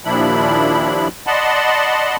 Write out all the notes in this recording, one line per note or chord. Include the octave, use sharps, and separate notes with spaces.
D#2 A#2 F3 D4 E4 B5
D5 D#5 F#5 A5 B5 C6